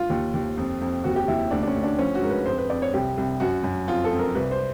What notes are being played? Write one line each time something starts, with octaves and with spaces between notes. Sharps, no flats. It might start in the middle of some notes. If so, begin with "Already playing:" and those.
Already playing: F4
D#2
D#2
F2
F2
D#2 F#4
G4
D#2 E4
D2 D4
D4
C#4
D2
D4
F3 C#4
F#4
G#2 A#4
B4
F2 C5
B4
F2 D5
C#5
C2 G4
C2
F#2 F#4
F#2
F2 F4
A4
F2
A#4
C2 B4
C5